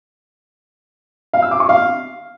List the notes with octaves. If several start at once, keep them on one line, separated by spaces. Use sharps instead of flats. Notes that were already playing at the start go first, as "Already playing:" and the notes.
F5
E6
D6
C#6
F5